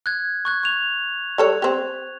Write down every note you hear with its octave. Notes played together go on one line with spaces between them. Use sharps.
F#6 G#6
C#6 F#6 G#6
C#6 F7
G3 A4 C#5
C4 G4